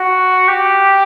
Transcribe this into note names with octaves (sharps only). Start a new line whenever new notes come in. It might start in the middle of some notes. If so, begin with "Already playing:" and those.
Already playing: F#4
G4